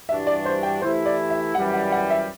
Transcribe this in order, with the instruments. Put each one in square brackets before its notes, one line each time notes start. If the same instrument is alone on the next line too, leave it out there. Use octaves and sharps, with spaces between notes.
[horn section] G2 E3 G3 D4 F#4 [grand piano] E5
[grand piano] D5
C5
G5
[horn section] E3 A3 E4 G4 [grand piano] C5
[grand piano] D5
E5
[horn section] F#2 E3 G3 [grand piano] F#5
[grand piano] F#5
F#5
E5